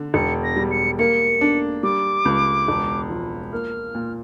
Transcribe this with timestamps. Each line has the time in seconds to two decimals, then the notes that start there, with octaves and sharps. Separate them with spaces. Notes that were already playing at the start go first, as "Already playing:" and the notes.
Already playing: D3
0.14 E1 C#7
0.43 A#6
0.56 G3
0.71 C#7
0.99 A#3 C#7
1.41 D4
1.83 G3 D6
2.25 C#2
2.68 E1
3.10 F3
3.53 A#3 F6
3.95 A#2